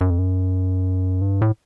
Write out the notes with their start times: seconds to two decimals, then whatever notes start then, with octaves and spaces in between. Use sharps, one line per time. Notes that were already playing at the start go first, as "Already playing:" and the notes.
0.01 F#2
0.10 F2
0.18 F#2
1.22 G2
1.42 A2